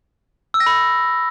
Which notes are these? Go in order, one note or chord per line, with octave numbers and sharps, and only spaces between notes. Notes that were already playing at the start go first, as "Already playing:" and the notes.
E6
A#6
B5